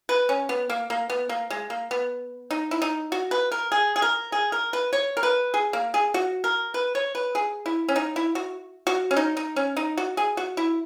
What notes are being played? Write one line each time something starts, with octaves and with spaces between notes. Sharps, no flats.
B4
C#4
B3
A#3
A#3
B3
A#3
G#3
A#3
B3
D#4
E4
D#4
F#4
B4
A#4
G#4
G#4
A#4
G#4
A#4
B4
C#5
A#4
B4
G#4
A#3
G#4
F#4
A#4
B4
C#5
B4
G#4
E4
C#4
D#4
E4
F#4
F#4
C#4
D#4
D#4
C#4
D#4
F#4
G#4
F#4
E4